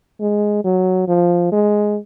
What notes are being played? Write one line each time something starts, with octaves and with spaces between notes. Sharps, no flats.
G#3
F#3
F3
G#3